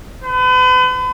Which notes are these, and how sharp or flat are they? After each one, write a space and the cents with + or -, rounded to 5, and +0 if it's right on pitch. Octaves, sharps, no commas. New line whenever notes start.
B4 +40